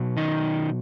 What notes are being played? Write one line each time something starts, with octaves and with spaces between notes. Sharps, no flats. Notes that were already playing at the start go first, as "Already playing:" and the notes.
Already playing: B2 F#3
D#3 D#4